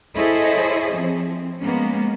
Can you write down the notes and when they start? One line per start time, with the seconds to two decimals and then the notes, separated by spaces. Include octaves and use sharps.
0.16 E4 G#4 A4 C5 C#5 D#5
0.92 F3 C4
1.61 G#3 A#3 B3 C#4